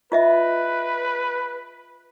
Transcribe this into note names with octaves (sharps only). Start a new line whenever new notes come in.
F4 B4 D#5 E5